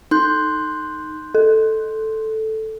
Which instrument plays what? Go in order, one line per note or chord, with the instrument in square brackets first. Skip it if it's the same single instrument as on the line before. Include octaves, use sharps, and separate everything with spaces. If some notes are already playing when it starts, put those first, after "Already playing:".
[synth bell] D#4 [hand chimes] C6 F#6 G6
[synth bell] A4